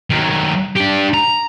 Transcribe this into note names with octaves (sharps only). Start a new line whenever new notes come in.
D#3 F#3
D4 G4
A#5